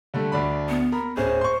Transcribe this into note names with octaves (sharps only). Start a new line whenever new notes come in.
D3 G3 A3
D2 D4 B5
B3
A#4 A#5 B5
D1 C#4 G#4 C5
C6 C#6